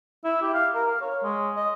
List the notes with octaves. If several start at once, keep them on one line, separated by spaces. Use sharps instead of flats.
E4
G4
F5
A#4
F5
C#5
G#3
D#5